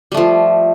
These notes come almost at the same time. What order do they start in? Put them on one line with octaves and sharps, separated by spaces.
G3 A3 F3